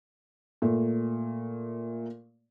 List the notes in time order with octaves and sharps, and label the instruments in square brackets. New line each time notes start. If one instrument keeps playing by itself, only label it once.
[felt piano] A#2 A3